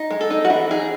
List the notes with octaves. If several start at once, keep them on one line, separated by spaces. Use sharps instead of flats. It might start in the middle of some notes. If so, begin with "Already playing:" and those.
Already playing: D#4
G#3
A4
D#4
F#4
E3 E4
D#4 G#4